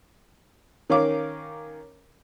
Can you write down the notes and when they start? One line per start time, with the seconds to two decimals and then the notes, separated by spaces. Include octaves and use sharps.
0.90 D#3 C#4 A#4 F5 D6